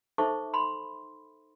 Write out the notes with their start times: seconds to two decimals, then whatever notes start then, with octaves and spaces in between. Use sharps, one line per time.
0.18 D#4 A4 C5 E5 C#6 D6
0.54 B5 C6